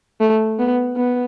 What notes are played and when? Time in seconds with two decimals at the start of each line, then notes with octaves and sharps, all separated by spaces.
0.21 A3
0.59 B3
0.97 B3